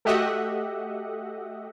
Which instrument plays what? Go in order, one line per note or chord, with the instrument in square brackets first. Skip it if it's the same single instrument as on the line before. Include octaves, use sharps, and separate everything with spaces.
[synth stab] A3 F#4 G4 D#5 E5 F#5